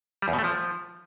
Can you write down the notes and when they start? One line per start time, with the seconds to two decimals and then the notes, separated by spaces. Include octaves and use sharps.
0.22 G3
0.28 E2
0.33 B2
0.39 A3
0.44 F3